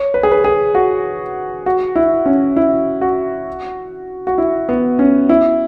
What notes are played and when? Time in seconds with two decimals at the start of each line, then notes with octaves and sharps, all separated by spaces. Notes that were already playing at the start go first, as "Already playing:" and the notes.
Already playing: C#5
0.14 B4
0.23 G#4
0.31 B4
0.44 G#4
0.75 F#4
1.66 F#4
1.96 E4
2.26 C#4
2.56 E4
3.01 F#4
4.27 F#4
4.38 E4
4.69 B3
4.99 C#4
5.29 E4